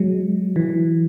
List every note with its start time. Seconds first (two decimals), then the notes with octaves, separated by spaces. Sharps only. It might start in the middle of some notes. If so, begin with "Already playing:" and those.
Already playing: F#3 G#3
0.56 E3